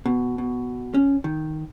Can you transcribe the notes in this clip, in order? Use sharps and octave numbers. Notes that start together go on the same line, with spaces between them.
B2
B2
C#4
D#3